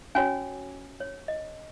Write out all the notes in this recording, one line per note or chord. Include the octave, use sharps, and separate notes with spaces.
C#4 F#4 C#5 G#5
C#5
D#5